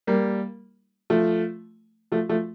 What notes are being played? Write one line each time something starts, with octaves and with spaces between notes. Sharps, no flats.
G3 A#3
F3 A3
F3 A3
F3 A3